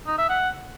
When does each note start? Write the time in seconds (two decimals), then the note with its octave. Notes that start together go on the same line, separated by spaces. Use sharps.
0.07 D#4
0.18 E5
0.30 F#5